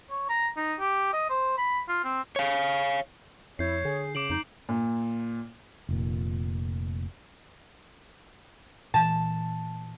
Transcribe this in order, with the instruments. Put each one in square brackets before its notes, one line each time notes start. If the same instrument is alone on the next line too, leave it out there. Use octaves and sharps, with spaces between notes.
[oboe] C#5
A#5
D#4
G4
D#5
C5
B5
F4
C4
[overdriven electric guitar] C#5 F5
[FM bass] F2 [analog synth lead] E4 [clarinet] C#5 [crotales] G6 C7
[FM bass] D3 [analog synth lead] G#4
[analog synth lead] C#3 [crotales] D6 D7 F#7
[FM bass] F2 [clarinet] D#4
[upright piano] A#2
[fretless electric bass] F1 A#2
[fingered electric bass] A#2 E3 [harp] A5